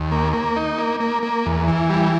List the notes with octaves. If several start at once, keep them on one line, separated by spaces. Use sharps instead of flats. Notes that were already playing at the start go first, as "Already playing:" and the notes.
Already playing: D#2
A#3
A#3
D#4
A#3
A#3
A#3
E2
E3
G3